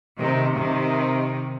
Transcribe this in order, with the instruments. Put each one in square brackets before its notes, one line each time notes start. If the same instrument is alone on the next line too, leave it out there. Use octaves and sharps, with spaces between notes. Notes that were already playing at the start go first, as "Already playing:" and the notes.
[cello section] C3 D#3
C3 D#3